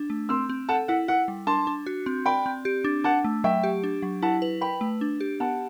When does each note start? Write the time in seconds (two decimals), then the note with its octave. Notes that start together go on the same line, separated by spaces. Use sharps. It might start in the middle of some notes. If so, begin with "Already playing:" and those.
Already playing: D4
0.10 A3
0.29 C4 C6 E6
0.50 C4
0.69 A4 F#5 A5
0.88 E4 F#5
1.08 E4 F#5
1.28 G3
1.47 D4 A5 C6
1.67 D4
1.86 F#4
2.06 C4
2.26 D5 G5 B5
2.46 C4
2.65 G4
2.84 D4
3.04 D4 F#5 A5
3.24 A3
3.44 F#3 E5 G5
3.63 G4
3.84 D4
4.02 F#3
4.22 E4 F#5 A5
4.42 B4
4.61 B4 G5 B5
4.81 A3
5.01 D4
5.21 G4
5.40 B3 F#5 A5